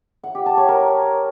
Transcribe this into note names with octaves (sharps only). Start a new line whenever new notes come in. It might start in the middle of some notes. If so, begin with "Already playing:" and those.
F#5
G4
A5
C#5
A#4